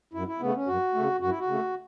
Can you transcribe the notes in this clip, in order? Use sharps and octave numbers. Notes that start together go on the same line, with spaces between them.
F#2 E4
E4
C#3 A3 B3
C#4
F#2 F#4
C#3 A3
F#2 F#4
E4
F#4
C#3 A3